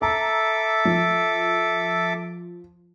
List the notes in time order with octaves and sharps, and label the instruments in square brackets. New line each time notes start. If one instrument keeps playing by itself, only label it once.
[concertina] A4 E5 D6 [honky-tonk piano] A#5
[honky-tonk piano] F3